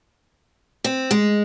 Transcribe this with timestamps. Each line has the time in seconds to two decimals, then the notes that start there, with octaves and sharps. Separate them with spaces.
0.84 C4
1.11 G#3